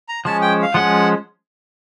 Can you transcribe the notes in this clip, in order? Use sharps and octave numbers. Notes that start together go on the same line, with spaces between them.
A#5
F3 G#3 C#4 A5
G5
F5
F3 G#3 C#4 F#5